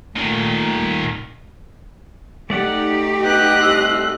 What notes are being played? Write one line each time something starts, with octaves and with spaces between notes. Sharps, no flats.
A#2 D#3 A3
A3 D#4 G4 D5 F#5
B3 D#5 G5 F#6
C2 C6 E6